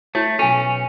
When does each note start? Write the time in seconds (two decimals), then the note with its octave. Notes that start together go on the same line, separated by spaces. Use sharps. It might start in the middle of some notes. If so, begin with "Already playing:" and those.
0.15 A3 E4 C#5
0.39 B1 C#4 A4 G#5